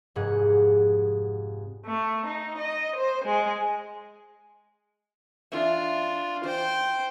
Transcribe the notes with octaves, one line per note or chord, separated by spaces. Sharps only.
F1 G#2 G#4 F#5
A3
D#4
D#5
C5
G#3
E3 D4 F4 E5
E3 C5 G5